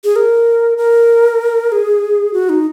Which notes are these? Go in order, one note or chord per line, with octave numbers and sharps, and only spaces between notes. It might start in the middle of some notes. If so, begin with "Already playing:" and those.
G#4
A#4
A#4
G#4
F#4
D#4